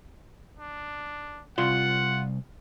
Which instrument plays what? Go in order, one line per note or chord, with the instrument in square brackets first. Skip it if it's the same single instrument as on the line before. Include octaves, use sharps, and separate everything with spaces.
[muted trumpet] D4
[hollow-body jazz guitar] C2 D5 C6 [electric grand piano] F4 [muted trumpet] F#5